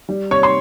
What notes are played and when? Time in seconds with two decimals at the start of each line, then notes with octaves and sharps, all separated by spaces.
0.09 G3
0.31 C3 C#5 C#6
0.43 C6